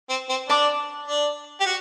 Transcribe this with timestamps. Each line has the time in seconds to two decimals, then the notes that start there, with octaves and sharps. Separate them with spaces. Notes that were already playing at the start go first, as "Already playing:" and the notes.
0.10 C4
0.29 C4
0.49 D4 D5 A5 D6
1.08 D4
1.60 G4
1.66 F#4